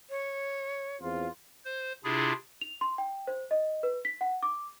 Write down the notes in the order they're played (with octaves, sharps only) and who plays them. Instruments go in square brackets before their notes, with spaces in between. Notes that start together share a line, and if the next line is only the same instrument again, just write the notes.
[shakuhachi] C#5
[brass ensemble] E2 C4 F4
[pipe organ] C5
C3 D4 E4 F4 G#4
[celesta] F7
C6
G5
C5
D#5
B4
B6
F#5
D6